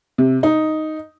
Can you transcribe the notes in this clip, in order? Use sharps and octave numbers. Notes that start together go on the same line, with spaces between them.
C3
D#4